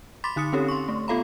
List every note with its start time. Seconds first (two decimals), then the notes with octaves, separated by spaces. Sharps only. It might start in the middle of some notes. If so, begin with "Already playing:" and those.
0.24 B5 C6 D6 A6 B6
0.36 D3 D#4 D#6 C#7
0.53 C4 C#4 D#4 G4 A4 C#5
0.68 C6 C#6
0.88 A3
1.08 B3 F4 A4 F5 A#5 B5